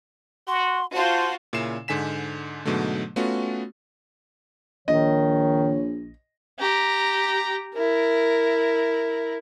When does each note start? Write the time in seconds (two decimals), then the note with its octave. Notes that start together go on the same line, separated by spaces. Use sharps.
0.48 F#4 C6
0.95 F4 F#4 C5 A5
1.53 A#2 C#3 C#4 E4 C7 E7
1.88 G#2 D3 G#5 B6 E7
2.65 G#2 B2 D3 F#3 A3
3.16 A3 B3 C#4 F4 F#4
4.88 A#1 D#3 C#5 D#5
6.59 G4 A#5
7.74 E4 A#4